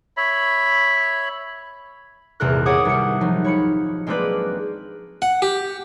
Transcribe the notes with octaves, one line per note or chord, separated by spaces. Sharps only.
C#5 E5 B5
D#1 G#1 E2 C3 A#4 F#6
C#5 F#5 D6 D#6 G#6
C2 C#7
F3 F#3 D#4
C#5 B5 C#7
G#3 A#3 C4 D4 B4 D5
F#5
G4